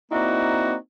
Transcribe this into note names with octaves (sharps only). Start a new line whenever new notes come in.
A#3 C4 D#4 E4 F#4 D5